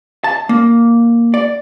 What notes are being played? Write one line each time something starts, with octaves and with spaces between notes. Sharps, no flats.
A5
A#3
D5